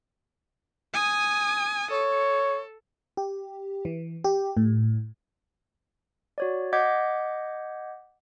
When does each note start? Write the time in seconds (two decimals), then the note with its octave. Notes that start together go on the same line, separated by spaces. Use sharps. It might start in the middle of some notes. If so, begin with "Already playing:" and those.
0.94 G#5 D#6
1.91 A4 C#5
3.17 G4
3.85 E3
4.24 G4
4.57 A2
6.38 F#4 C#5 D5
6.73 D#5 F#5 D6 G6 G#6 B6